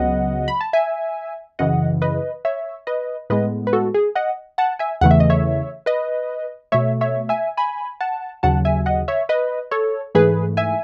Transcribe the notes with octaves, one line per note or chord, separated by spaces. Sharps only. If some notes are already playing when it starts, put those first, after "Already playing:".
Already playing: C#2 C#3 F#3 B3 D#5 F#5
B5
A5
E5 G#5
F#2 C#3 E3 D#5 F#5
B4 D#5
C#5 E5
B4 D#5
A2 G#3 B3 B4 D#5
B4
F#4 A4
G#4
D#5 F#5
F#5 A5
E5 G#5
E2 C#3 E3 A3 F#5
E5
D#5
C#5 E5
B4 D#5
B2 A3 C#5 E5
C#5 E5
E5 G#5
G#5 B5
F#5 A5
D#2 C#3 F#3 F#5 A5
E5 G#5
D#5 F#5
C#5 E5
B4 D#5
A4 C#5
G#2 E3 A3 G#4 B4
E5 G#5